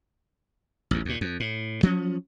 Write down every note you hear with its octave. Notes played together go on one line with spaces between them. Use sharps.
A1 D#2
D#2 A#2
F2
A2
F3 F#3 A3 C#4